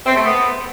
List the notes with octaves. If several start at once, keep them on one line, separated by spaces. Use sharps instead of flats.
C4
A3
B3